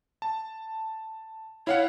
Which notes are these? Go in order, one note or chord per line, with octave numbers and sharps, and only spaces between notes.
A5
E4 C#5 F5 F#5